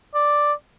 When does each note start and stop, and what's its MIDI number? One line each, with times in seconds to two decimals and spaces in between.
0.14 0.52 74